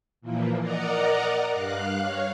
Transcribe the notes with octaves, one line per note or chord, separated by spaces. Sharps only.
A#2 E3 F3 A#3
A#4 D5 D#5 F#5 A#5
G2 F5 F#6
C#5 F5